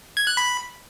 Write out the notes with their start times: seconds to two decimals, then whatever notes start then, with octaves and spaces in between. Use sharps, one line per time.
0.17 G#6
0.27 F#6
0.37 B5